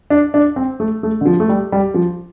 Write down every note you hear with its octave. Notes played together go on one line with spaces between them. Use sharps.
D4
D4
C4
A3
A3
D3
F3
A3
G3
G3
F3